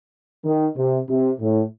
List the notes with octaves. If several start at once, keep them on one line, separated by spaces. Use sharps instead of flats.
D#3
C3
C3
A2